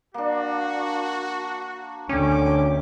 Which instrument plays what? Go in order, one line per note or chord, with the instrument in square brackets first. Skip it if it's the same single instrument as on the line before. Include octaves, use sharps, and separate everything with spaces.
[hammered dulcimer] A#3 D4 [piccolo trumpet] F#4
[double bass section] D2 [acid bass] C#4 [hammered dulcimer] G4 G5 [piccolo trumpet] D6